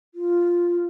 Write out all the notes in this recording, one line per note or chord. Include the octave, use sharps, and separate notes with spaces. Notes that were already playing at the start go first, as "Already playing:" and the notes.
F4